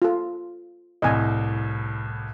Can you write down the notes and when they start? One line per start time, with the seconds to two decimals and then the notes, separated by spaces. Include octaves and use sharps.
0.02 F4 A4
1.02 C2 A2 D#5 G#5